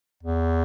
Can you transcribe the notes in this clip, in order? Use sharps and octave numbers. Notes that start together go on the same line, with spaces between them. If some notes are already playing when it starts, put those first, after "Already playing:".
E2